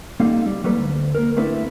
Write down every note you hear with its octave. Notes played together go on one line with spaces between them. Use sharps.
G3 A#3 C4 D#4 A4 F5
G3
F#3 G3 A#3 A4 B4
D2
A#3 A#4
A3 C4 D4 E4 A4 B4